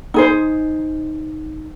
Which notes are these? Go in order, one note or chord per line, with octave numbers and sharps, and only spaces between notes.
D#4 G#4 C5